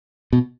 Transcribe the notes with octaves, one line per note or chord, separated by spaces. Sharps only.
B2